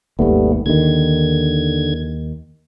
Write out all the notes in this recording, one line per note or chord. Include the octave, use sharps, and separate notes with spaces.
G#1 D#2 G3 A3 B3
D#2 D3 D#3 G#6